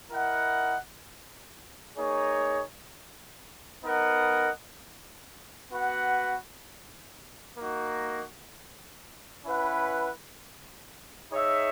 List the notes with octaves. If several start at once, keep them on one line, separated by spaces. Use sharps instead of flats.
E4 A#4 D#5 F#5
A#3 D#4 G#4 C#5
B3 D#4 A#4 D#5 F#5
B3 F#4 B4 F#5
A#3 D#4 F#4
C#4 E4 B4 F#5
D#4 G#4 C#5 E5